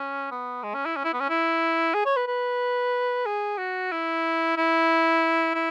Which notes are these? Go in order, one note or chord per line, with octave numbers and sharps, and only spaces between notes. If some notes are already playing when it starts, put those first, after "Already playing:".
Already playing: C#4
B3
G#3
C#4
E4
C#4
E4
B3
C#4
E4
G#4
C#5
B4
B4
G#4
F#4
E4
E4
E4